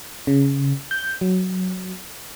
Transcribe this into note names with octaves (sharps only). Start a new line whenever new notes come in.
C#3
G6
F#3